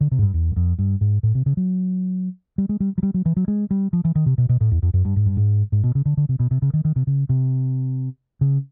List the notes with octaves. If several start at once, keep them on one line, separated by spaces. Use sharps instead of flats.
D3
C3
G#2
G2
E2
F#2
F2
G2
G#2
A2
C3
C#3
F#3
G3
G#3
G3
F#3
G3
F#3
E3
F#3
G#3
G3
F3
E3
D#3
C3
B2
B2
A2
E2
F2
F#2
G2
G#2
G2
G#2
G#2
B2
C#3
D3
D3
C3
B2
C3
C#3
D#3
D#3
C3
C#3
C3
C#3